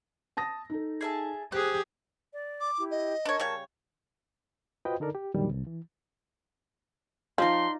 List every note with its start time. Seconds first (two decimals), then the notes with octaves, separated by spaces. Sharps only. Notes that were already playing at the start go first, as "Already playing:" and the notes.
0.37 A5 D#6 A#6
0.70 D#4 A4
1.01 G#4 E5 A5
1.52 G4 G#4 C5 F#6
2.33 D5
2.61 D6
2.78 E4 G4
2.91 D#5
3.25 D4 A#4 C#5 A5 C#6
3.40 C#3 G3 C#5
4.85 F4 F#4 B4 C5 D#5 G5
5.00 D3 D#4 A4 A#4 D5
5.15 G4
5.34 F2 A#2 D3 D#3 F#3 G3
5.49 C2
5.67 E3
7.38 F3 D#4 F4 D5 C6